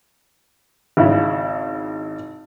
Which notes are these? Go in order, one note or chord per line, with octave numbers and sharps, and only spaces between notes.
G#1 C#3 E4